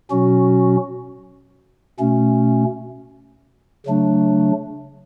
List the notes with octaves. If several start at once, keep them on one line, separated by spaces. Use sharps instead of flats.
B2 F#3 C#4 F#4
B2 A3 C#4
C#3 F#3 A3 D4